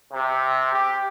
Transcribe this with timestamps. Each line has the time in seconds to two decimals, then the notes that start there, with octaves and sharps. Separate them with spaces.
0.12 C3
0.73 G4